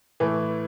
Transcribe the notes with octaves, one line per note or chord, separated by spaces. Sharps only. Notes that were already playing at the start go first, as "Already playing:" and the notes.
A2 E3 A3